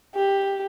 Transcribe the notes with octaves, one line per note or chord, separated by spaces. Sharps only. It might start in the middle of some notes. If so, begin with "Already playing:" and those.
G4